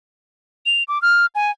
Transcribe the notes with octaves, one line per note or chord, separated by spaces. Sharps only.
F7
D6
F6
G#5